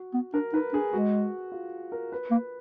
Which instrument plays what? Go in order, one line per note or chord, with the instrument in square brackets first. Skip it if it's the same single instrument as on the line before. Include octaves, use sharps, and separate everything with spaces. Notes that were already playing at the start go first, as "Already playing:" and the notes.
Already playing: [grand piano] F#4
[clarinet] B3
[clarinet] D4 [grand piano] A#4
[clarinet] D#4 [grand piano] B4
[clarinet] D4 [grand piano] G#4
[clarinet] G#3 [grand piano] F#4
[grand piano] F4
A#4
B4
[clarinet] A#3